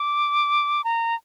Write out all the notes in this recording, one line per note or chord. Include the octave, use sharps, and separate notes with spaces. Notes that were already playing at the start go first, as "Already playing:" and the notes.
Already playing: D6
A#5